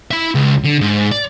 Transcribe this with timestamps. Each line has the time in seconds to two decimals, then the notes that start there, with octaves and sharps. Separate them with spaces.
0.11 E4 E5
0.35 C#2
0.64 D3
0.81 G#2
1.12 D5